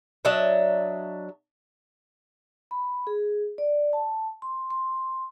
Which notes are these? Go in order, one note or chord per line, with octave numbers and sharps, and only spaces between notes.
F#3 D4 D#5 E5
B5
G#4
D5
A5
C6
C6